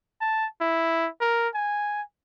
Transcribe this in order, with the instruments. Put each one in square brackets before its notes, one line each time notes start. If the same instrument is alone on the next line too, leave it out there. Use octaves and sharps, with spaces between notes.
[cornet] A5
E4
A#4
G#5